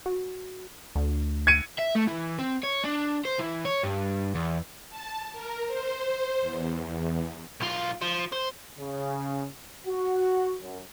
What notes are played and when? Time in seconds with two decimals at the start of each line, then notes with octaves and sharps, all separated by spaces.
0.06 F#4
0.96 D2
1.47 G#6 C#7 D#7
1.78 E5
1.95 A3
2.07 E3
2.39 C4
2.63 C#5
2.84 D4
3.25 C5
3.39 E3
3.65 C#5
3.83 G2
4.35 E2
4.90 A5
5.32 A#4
5.67 C5
6.41 E2
7.60 B1 F4
8.01 F3
8.32 C5
8.77 C#3
9.86 F#4
10.61 F#2